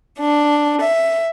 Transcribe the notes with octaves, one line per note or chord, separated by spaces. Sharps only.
D4
E5